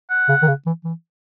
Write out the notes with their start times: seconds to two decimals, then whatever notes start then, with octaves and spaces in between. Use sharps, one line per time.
0.10 F#5
0.29 C#3
0.42 D#3
0.48 C#3
0.66 E3
0.84 E3